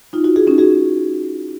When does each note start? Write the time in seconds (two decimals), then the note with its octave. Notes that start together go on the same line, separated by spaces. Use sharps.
0.13 D#4 F4
0.24 E4 F#4
0.36 F#4 G#4
0.47 C#4 D#4
0.58 F#4 G#4